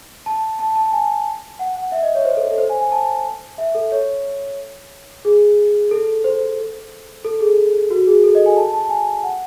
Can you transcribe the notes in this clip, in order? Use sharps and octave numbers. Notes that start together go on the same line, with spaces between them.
A5
A5
A5
G#5
F#5
F#5
E5
D#5
C#5
C5
A4
A4
C5
G#5
G#5
A5
E5
A4
C#5
G#4
A4
C5
A4
G#4
F#4
G#4
A4
D#5
G#5
A5
A5
G#5
F#5